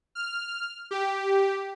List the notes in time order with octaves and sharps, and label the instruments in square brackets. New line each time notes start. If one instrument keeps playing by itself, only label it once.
[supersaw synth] F6
G4